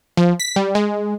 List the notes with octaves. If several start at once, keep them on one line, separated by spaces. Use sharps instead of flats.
F3
B6
G3
G#3